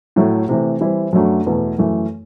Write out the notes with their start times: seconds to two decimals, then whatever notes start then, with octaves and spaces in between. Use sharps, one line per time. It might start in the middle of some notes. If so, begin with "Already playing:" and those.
0.16 A2 F#3 A3
0.49 C3 E3 A3
0.81 E3 G3 C4 E4
1.13 F#2 F#3 A3 D4 F#4
1.46 E2 B2 A3
1.78 F#2 E3 A3